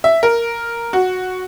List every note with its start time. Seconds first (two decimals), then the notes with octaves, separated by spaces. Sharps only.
0.04 E5
0.23 A#4
0.93 F#4